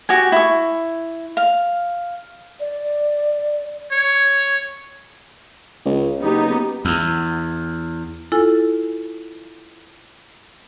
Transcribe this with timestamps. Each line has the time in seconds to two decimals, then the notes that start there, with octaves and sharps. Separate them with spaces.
0.09 F#4 G4 G#5
0.32 E4 C#6
1.37 F5
2.60 D5
3.92 C#5
5.85 C#2
6.22 F#1 B3 D#4 G4
6.85 E2
8.32 E4 F4 A4 G#5